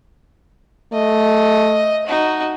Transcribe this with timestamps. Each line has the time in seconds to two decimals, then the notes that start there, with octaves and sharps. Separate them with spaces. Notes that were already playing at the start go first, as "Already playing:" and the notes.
0.93 A3 D#5
2.06 D#4 F#4